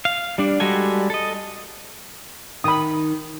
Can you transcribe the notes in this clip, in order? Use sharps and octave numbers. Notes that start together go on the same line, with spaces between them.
F5
G3 D4
G3 G#3 F#4 A4 G#5
A4 D#5
D#3 B5 D#6